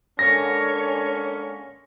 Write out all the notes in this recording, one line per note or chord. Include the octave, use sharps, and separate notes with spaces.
D3 G#3 A#3 C#4 C#5 A#6